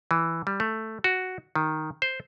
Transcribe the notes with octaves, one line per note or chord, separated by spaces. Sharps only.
E3
G3
A3
F#4
D#3
C5